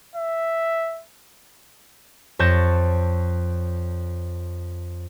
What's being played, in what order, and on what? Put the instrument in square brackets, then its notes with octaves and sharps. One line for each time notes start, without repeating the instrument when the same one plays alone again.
[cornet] E5
[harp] F2 C#5 A5 G6 A#6 E7